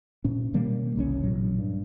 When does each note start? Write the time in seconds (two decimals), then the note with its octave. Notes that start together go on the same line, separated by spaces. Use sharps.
0.24 A#2 C#4
0.53 B2 D#3 G3 A#3
0.96 F#1 C2 C3 C#4
1.23 A1 A#2 F#3
1.59 G2